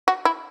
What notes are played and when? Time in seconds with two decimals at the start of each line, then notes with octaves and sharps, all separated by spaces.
0.08 F#4
0.25 E4